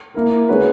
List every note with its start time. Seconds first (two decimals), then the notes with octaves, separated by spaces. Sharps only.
0.14 A#3 E4 A#4
0.49 G#3 C#4 F#4 B4